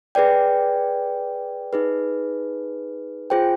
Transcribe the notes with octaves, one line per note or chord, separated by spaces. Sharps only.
G#4 B4 D5 G5
D#4 G#4 B4
F4 G#4 C5 G5